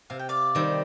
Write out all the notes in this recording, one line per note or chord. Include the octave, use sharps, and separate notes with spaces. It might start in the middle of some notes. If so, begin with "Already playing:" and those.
C3 F5
G5
D5 F5
D#3 G3 C4